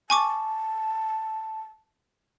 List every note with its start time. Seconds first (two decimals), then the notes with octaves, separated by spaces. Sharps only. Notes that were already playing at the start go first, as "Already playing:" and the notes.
0.10 G#5 A5 C#6 D6